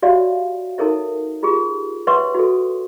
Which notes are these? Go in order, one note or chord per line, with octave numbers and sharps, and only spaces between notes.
F#4 G4 C#5 D5 E5 F5
D#4 A4 A#4 C#5 E5
F4 G4 G#4
B4 C#5 E5 F#5 C6 C#6
F#4 A4